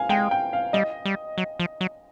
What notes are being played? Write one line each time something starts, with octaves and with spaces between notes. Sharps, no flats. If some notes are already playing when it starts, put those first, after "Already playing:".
Already playing: F5 G#5
G#3 G5
G5
F5
G3 D#5
G3
F#3
F3
F#3